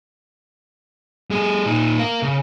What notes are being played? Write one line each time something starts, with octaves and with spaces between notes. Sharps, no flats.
G3 G#4
A#2 D#4
A#4 F5
C#3